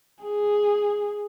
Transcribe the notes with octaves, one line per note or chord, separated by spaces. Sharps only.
G#4